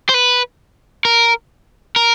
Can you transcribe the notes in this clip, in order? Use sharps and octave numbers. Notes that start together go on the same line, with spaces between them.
C5
B4
A#4
A#4